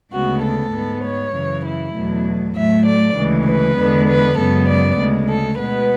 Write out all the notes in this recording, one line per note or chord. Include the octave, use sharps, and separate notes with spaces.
D2 C#3 G#3 B3 F#4
A4
G#2 G#3 B3
C#5
F#2 C#3 E3
E4
E2 B2 F#3 A3
A2 F#3 A3 E5
D5
D2 C#3 E3 G#3
B4
E2 D3 G#3 B3
B4
F#2 C#3 G#3 B3 A4
D5
D2 C#3 G#3
A4
B2 G#3 B3 B4